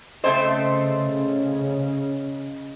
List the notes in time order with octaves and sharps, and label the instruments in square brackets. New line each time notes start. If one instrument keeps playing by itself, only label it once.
[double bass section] C#3 [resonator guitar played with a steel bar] A3 C4 C5 [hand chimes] D#5